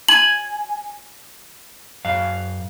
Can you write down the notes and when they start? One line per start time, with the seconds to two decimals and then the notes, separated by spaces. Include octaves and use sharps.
0.08 G#5 F#7
2.05 F#2 F5